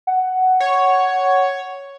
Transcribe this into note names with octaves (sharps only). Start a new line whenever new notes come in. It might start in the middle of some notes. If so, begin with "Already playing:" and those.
F#5
C#5